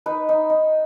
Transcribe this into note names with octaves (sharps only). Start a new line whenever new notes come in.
D#4 B4
D#4
D#4